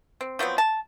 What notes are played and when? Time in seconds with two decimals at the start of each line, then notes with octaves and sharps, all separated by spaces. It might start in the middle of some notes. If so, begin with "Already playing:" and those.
0.21 C4
0.39 F3 F#3 B3 C4
0.58 A5